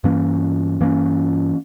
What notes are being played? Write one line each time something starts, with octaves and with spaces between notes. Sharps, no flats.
G2 E3 A#3 C#4
G2 E3 A#3 C#4